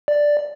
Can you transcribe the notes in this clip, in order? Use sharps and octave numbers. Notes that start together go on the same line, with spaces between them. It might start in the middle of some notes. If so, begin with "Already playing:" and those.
D5